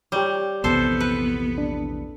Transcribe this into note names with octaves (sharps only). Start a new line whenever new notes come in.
G3 G4 C#5
A#1 E2 C3 B3 A4 C5
B4
D4